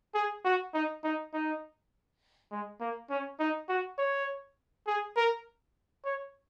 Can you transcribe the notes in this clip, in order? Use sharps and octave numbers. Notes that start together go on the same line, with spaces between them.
G#4
F#4
D#4
D#4
D#4
G#3
A#3
C#4
D#4
F#4
C#5
G#4
A#4
C#5